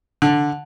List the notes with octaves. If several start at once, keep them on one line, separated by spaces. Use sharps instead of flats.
D3